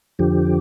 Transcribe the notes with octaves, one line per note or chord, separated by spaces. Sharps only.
F2 D3 F3 G4